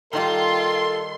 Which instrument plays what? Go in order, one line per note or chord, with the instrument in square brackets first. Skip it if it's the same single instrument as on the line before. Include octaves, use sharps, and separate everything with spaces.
[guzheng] D#3 G3 [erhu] F4 [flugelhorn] A4 [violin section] C6